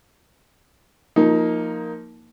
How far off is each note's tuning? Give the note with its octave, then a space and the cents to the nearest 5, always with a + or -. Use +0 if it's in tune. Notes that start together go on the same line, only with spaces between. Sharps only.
F3 +0 A#3 +0 D#4 +15